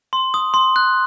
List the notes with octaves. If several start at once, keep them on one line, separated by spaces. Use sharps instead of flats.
C6
D#6
C6
F#6